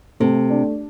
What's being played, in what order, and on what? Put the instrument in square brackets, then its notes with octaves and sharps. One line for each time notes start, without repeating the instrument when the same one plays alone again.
[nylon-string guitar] C3 [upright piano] A3
[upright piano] D4